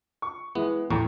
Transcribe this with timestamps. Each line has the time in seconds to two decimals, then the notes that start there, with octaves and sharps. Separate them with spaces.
0.22 C#6
0.55 E3 G#3 B3
0.90 E2 A2 G5 A#5 C#6